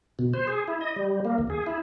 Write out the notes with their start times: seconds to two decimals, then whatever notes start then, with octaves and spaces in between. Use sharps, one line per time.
0.19 B2
0.34 C5
0.47 G#4
0.68 E4
0.81 D#5
0.96 G3
1.25 A#3
1.38 D#2
1.50 G#4
1.66 E4